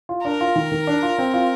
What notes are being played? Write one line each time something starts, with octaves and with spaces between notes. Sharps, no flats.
F4
D4 A#4
F4
D#3
D#3
D4
F4
C4
F4